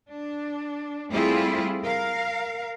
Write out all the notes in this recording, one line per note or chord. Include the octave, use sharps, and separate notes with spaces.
D4
G3 A3 C4 E4 F4 G#4
A#4 F5